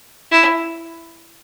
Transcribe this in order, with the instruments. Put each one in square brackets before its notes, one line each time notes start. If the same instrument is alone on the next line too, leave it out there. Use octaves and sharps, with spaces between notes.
[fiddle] E4